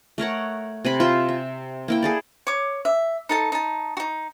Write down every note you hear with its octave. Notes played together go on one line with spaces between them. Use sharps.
A3 A#4 C#5 F#5
C3 G#5 B5
F4 C5 E5
E5
A#3 E4 G5
G#4 A4 D5
C#5 D6
E5
D#4 A4 A5
D#4 A5
D#4 F#4